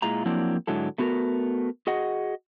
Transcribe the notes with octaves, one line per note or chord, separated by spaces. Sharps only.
A#2 G#3 E4 F4 A#5
F3 F#3 A#3 C4 D4 E4
G#2 D3 F#3 E4 A4
A3 B3 F#4 G#4 A#4
F#4 G#4 D#5 F#5